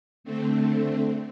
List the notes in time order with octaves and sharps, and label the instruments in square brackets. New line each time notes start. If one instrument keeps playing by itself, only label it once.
[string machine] D3 A3 C4